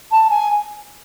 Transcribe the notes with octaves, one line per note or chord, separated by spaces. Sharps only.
A5
G#5